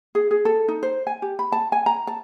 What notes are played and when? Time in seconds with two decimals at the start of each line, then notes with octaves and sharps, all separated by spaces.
0.15 G#4
0.31 G#4
0.45 A4
0.68 D#4
0.83 C5
1.07 G#5
1.22 G4
1.39 B5
1.52 A5
1.72 G#5
1.86 A#5
2.07 A5